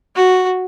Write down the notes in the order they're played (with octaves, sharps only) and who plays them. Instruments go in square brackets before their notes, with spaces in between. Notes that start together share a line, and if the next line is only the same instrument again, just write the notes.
[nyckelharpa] F#4